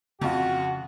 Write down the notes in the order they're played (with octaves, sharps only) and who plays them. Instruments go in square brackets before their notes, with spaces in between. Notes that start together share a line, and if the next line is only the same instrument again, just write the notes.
[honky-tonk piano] F2 F4 [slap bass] C#3 [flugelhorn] F#4